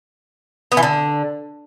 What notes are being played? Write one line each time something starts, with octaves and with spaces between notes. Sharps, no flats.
B3
E3
D3